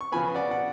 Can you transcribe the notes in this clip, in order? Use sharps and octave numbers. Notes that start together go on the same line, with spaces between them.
C#6
C#3 F3 B3 G#5 B5
D5 F#5
F#5